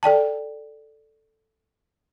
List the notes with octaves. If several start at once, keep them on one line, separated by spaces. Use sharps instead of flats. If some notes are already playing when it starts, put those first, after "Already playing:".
A4 D5 G5 A5